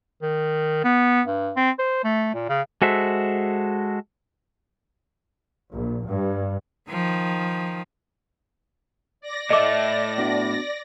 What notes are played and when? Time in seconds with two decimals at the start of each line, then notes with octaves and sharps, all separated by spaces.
0.22 D#3
0.84 B3
1.27 G2
1.57 C4
1.79 C5
2.04 A3
2.34 A#2
2.49 C#3
2.82 G#3 F#4 A4 C5 E5
5.71 A#1
6.06 G2
6.89 D#3 F3
9.21 D5 A#6
9.50 A2 A4 D#5 E5 D6
10.18 B3 D4 F#4